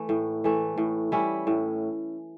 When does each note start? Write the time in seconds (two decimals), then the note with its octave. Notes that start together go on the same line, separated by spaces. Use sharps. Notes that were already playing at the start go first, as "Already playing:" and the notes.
Already playing: E3 A3
0.09 A2
0.44 E3 A3
0.78 A2
1.12 G3 C#4 E4
1.47 A2